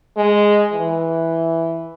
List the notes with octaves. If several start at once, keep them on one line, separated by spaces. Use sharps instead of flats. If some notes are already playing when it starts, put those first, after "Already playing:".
G#3
E3